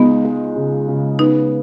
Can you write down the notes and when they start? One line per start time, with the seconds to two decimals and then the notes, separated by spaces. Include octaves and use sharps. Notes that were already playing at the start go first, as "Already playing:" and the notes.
Already playing: C#2 G#3 B3 D#4
0.25 G#3
0.56 C#3
0.88 C#3
1.19 B3 D#4